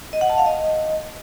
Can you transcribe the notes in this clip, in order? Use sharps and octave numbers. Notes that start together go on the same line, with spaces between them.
D#5
F#5
A5
F5
D#5